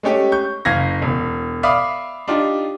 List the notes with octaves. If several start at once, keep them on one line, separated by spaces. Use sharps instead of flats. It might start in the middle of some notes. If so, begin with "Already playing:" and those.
G#3 A3 C#4 G4
C#6 G6
F#1 F5 G#6 A#6
E1
D5 E5 F5 B5 D6 D#6
D4 D#4 F4 G4